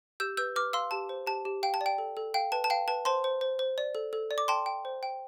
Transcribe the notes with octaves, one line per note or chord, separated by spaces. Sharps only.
G4 E6 G6
B4 E6 G6
B4 D6 F6
F5 C6 E6
G4 A5
C5
G4 A5
G4
F5 G5
A5
D5
G5
A4
A4
F5 G5
B4 A5
A5
F5 G5
B4 A5
C5 A5 C6
C5
C5
C5
D5
A4
A4
D5
D6
G5 A5 C6
G5
C5
G5